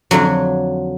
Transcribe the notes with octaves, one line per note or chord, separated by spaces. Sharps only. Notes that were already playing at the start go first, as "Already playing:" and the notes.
F2 D3 F3 F#3